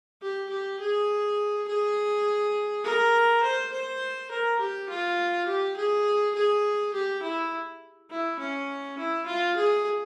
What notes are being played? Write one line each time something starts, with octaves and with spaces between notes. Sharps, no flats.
G4
G4
G#4
G#4
A#4
C5
C5
A#4
G4
F4
G4
G#4
G#4
G4
E4
E4
C#4
E4
F4
G#4